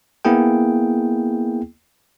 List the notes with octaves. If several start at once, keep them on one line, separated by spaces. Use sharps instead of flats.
A#3 B3 E4 G#4 G5